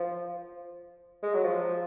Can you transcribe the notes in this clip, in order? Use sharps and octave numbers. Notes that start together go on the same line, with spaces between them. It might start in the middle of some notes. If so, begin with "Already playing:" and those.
Already playing: F3
G#3
F#3
F3